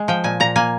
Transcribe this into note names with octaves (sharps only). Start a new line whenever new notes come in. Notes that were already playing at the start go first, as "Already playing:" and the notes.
Already playing: G#3
F3 G5
A#2 G#5
A#2 A#5
A#3 G#5